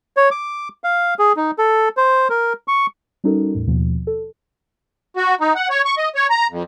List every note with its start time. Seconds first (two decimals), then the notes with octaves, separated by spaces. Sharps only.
0.17 C#5
0.31 D6
0.84 F5
1.19 G#4
1.36 D#4
1.58 A4
1.97 C5
2.30 A#4
2.68 C#6
3.24 G3 C#4 D#4 F#4 A4 A#4
3.55 E2 A2
3.67 D#2 B2 F3
4.07 A4
5.17 F#4
5.41 D#4
5.55 F#5
5.70 C#5
5.85 C#6
5.97 D#5
6.15 C#5
6.30 A#5
6.51 F2